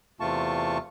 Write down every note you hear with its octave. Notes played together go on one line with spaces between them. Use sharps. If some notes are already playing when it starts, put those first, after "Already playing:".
E2 C3 A3 F4 A5 C#6